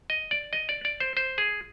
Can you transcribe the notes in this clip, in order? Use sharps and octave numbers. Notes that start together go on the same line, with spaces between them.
D#5
D5
D#5
D5
D5
C5
C5
G#4